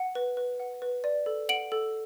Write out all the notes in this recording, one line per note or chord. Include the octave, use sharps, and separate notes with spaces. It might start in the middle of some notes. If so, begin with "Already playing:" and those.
Already playing: F#5
B4
B4
F#5
B4
D5
A4
F#5 D7 F#7
A4